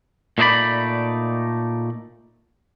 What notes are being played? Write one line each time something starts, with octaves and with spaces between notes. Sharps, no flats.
A#2 A3 D#4 C5 D5 B5